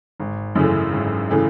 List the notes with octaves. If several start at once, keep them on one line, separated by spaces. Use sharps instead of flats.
G#1
F#2 C#3 E3 A3
G#1
C#3 E3 A3